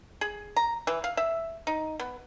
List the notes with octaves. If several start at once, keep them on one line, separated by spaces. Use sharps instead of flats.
G#4
A#5
E3
F5
E5
D#4
B3